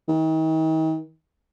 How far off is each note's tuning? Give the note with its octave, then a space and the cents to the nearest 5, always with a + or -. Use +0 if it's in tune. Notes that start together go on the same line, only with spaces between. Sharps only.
D#3 +40